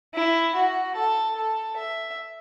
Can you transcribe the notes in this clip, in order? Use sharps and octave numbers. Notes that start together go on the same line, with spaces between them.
E4
F#4
A4
A4
E5